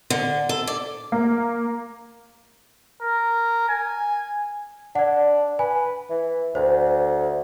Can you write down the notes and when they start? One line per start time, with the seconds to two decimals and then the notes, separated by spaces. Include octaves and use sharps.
0.10 D3
0.49 A4
0.67 D5
1.12 A#3
3.02 A#4
3.69 G#5
4.95 D4 D5 F#5
5.59 B4 G#5
6.10 E3
6.55 D2 C5